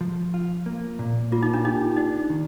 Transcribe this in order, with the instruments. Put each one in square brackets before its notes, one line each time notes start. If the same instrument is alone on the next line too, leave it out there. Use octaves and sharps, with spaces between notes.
[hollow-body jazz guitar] F3
F4
A#3
A#2
[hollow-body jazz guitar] A#3 [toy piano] F4
[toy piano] D#4
D4
[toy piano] D#4 [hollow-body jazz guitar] G4
[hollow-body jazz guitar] D4 [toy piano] D#4
[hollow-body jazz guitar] D#3